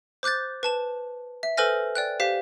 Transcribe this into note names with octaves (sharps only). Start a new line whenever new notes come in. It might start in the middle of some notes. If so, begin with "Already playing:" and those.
C5 D6 F#6 G6 A6
B4 A5 E7
E5
A4 B4 C5 G#5 F6 A#6
D5 G5 F#6
G4 C5 F5 B6